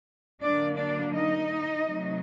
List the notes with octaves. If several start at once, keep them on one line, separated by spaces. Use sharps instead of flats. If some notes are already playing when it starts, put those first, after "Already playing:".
D3 F#3 A#3 D4 D5
D4 D5
D#4 D#5
C3 F#3 A3